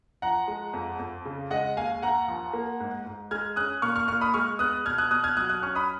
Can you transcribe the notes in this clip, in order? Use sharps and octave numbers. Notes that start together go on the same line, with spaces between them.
F3 F#5 A#5
G#3
F2
F2
C#3
G#3 D#5 F#5
D#2 F5 G#5
D#2 F#5 A#5
F3
A#3
G#2
G#2
G#3 F6 G#6
C#4 D#6 F#6
A#2 C#6 F6
C#6 F6
A#2 C#6 F6
B5 D#6
G#3 C#6 F6
B3 D#6 F#6
B2 F6 G#6
D#6 F#6
B2 D#6 F#6
F6 G#6
F#3 D#6 F#6
D#6 F#6
C#4 C#6 F6
B5 D#6